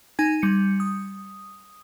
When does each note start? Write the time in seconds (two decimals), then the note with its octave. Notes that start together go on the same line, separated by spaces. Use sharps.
0.19 D#4 G#5 G#6
0.42 G3 C#7
0.80 D#6